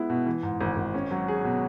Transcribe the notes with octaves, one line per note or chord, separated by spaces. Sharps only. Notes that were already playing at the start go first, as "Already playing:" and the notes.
Already playing: G#3 B3 E4
B2
E3
G#2
G#1
G#1
C#4
F#3
G#4
B2